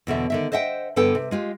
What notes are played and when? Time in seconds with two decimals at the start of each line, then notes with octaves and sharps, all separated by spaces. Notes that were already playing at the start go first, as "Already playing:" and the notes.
0.07 E2 B2 D3 E5
0.30 D3 D#3 E5
0.52 C5 D#5 E5 F#5 G5
0.96 G2 D3 B3 A4 B4 G5
1.15 C3
1.31 G#3 F4 G4